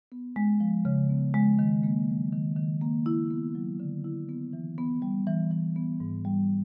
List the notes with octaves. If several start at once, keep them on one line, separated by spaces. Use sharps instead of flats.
B3
G#3
F3
C#3
B3
G#3
D#3
A#3
F#3
D#3
D#3
A#3
E4
B3
F#3
D3
E4
B3
E3
B3
G3
E3
E3
B3
G#2
G3